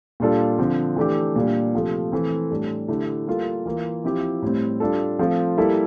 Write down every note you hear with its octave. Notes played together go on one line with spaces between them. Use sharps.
A#2 G3 D4 F4 A4
D3 F3 C4
E3 A3 D4 G4
A#2 G3 D4
C3 F3 A3
E3 A3 C4
A2 G3 D4 A4
D3 A3 E4 G4
G3 A#3 F4 A4
E3 A#3 F4
F3 C4 E4 G4
A2 G3 C4
G3 D4 F4 A4
F3 A3 C4 F4
G3 A#3 E4 A4